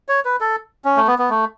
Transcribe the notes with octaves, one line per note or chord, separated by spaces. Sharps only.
C#5
B4
A4
C#4
A3
B3
B3
A3